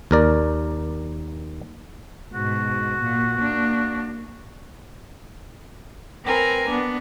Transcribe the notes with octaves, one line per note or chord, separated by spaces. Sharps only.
D#2 A#4 D5
G#2 B2 F#4
A#2 A#3
A#3 D4
C4 A#4 B4 G#5 A#5
B3 D4